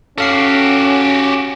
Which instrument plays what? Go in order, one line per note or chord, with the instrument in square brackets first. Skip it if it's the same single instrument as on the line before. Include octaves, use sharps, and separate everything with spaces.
[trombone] C#4 [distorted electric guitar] F#4 G4 [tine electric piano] A4 F5 C7